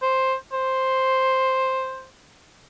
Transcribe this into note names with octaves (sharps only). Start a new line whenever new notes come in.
C5
C5